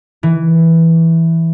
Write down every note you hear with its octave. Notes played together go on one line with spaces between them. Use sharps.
E3